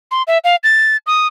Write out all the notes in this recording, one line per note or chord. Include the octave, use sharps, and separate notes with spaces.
C6
E5
F5
A6
D#6